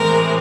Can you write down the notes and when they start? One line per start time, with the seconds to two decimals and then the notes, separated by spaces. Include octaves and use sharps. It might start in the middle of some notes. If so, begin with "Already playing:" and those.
Already playing: A2 E3 G#3 C4 A#4